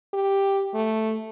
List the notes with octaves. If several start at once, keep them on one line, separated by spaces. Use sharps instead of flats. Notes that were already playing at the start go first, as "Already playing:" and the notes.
G4
A3